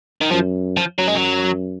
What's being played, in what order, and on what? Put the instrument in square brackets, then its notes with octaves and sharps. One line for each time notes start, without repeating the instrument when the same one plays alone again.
[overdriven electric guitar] D#3
[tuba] F#2 [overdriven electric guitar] F3
[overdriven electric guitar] F3
[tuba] F#2 [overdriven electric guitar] F#3
[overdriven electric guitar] G#3
F#3